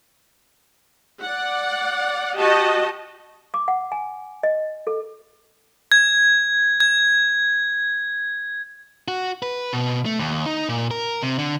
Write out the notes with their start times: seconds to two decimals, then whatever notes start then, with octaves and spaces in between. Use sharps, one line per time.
1.21 D5 F#5
2.37 F#4 G4 D#5 A5
3.54 D6
3.68 F#5
3.92 G#5
4.43 D#5
4.87 A4
5.92 G#6
6.80 G#6
9.08 F#4
9.43 B4
9.73 B2
10.06 A3
10.19 D#2
10.46 D#4
10.69 A#2
10.91 A#4
11.23 C3
11.39 D3